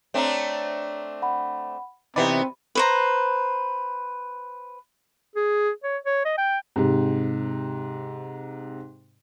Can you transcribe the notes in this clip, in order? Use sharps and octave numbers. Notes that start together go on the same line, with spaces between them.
A3 C4 D4 C#5 A#5
F#5 B5
C3 E3 B3 C4 D#4 D5 B5
B4 C5 A#5
G#4
C#5
C#5
D#5
G5
G#2 C3